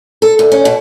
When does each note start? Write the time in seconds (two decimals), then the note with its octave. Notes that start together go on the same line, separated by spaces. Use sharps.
0.22 A4
0.39 D2
0.52 C#4
0.65 B2